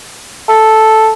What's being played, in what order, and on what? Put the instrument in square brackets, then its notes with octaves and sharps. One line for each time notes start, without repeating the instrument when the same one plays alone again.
[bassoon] A4